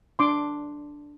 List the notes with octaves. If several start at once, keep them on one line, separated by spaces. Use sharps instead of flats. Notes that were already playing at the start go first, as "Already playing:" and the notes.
D4 C6 D6